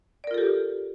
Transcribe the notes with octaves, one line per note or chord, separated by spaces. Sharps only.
F4 G4 A4 A#4 D5